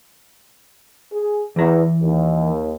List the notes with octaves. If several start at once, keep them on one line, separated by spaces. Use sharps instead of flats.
G#4
E2 E3 A#5
D#2